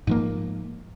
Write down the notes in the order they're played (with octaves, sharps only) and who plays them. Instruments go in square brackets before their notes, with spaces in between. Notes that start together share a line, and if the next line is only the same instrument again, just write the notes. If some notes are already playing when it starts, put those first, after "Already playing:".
[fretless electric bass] G#2 F3 A#3